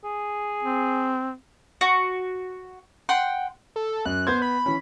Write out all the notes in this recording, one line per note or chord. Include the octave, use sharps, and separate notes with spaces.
G#4
C4
F#4
F#5 G5 C6
A4
F#2 F#6
B3 C5 G6 G#6
B5
E3 C#4